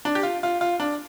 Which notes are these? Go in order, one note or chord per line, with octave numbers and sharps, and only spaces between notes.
D4
G4
F4
F4
F4
D4